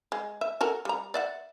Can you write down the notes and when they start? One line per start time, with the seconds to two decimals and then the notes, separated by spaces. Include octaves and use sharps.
0.12 G#3
0.41 E5
0.61 F#4 A4 A#4
0.85 G3 A#5
1.14 D5 E5 F#5